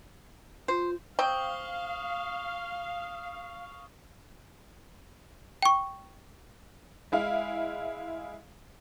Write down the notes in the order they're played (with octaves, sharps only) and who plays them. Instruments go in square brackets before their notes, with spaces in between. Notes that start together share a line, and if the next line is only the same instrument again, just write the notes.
[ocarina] F4 [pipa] C5
[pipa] C4 G5 [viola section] F5 [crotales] C#6 D#6 G7
[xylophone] G5 C#6
[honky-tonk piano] G#3 E4 F5